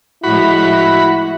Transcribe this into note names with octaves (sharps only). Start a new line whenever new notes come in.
A2 F3 G#3 E4 F#4 B5